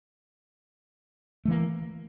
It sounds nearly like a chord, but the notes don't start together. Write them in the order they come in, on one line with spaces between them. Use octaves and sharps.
A3 E3 A#3